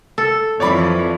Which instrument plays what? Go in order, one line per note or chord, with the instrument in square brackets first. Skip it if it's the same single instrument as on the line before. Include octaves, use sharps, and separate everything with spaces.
[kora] A4
[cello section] F2 E3 F3 [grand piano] C#5 D5 B5